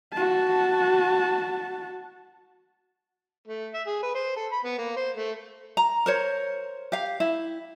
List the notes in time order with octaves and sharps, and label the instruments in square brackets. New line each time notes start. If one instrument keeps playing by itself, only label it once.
[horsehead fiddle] F#4 A5
[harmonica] A3
E5
G#4
B4
C5
A4
B5
B3
A#3
C5
A3
[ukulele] A#5
A#4 C5 C#5
G4 F5
E4